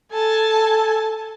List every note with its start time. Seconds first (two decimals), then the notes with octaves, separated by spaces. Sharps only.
0.10 A4 G#5 A5